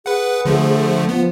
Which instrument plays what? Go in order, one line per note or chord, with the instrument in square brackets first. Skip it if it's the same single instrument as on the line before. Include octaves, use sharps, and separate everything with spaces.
[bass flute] G#4 [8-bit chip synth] B4 F#5
[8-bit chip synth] D3 F3 A3
[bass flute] F3 [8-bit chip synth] B3